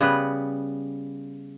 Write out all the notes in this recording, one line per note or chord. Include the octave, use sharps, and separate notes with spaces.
C#3 G3 B3 B4